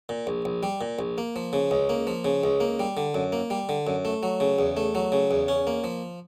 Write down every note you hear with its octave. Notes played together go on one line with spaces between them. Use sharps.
A#2
A#1
A#1
G3
A#2
A#1
A#3
F3
C#3
C#2
A#3
F3
C#3
C#2
A#3
G3
D3
F#2
A#3
G3
D3
F#2
A3
F#3
C#3
E2
A3
F#3
C#3
E2
C#4
A#3
F3